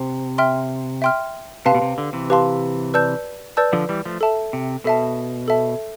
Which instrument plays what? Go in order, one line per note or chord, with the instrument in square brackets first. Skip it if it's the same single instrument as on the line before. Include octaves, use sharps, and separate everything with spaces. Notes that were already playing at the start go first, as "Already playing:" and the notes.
Already playing: [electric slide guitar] C3 [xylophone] C5
[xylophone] E5 G5 C6 F6
E5 G5 C6 F6
[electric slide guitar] C3 [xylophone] G4 B4 F5 A5 C6
[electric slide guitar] B2
C3
D3
C3 E3
[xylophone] G4 B4 F5 A5 C6
B4 D5 A5 E6 G6
B4 D5 A5 E6 G6
[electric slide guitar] D3 F3
E3 G3
F3 A3
[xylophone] A4 E5 A5
[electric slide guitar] C3
[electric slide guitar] B2 [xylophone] A4 E5 A5
[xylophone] A4 E5 A5